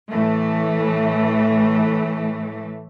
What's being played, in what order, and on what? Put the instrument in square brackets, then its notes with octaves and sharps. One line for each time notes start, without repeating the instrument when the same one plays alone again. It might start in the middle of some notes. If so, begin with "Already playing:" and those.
[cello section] A2 E3 A3